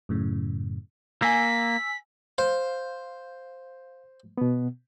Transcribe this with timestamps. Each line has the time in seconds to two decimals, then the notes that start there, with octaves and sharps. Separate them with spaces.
0.09 F#2 A2 C#3
1.22 A#3 G#5 E6 B6
2.38 C5 F5
4.38 B2 B3